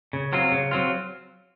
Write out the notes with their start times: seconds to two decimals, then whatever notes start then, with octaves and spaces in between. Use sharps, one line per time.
0.13 C#3
0.33 F#3 C4 F4
0.52 C#3
0.71 F#3 C4 F4